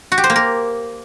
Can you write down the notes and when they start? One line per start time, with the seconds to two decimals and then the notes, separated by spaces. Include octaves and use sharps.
0.12 F#4
0.18 G4
0.24 C5
0.30 A#3
0.36 A#4